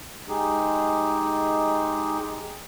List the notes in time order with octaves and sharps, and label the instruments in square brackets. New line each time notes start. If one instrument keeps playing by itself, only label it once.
[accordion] G#3 D#4 G4 G#4